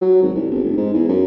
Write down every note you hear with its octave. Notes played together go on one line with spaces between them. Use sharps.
F#3
G#1
C2
G1
F1
G#2
E2
F#2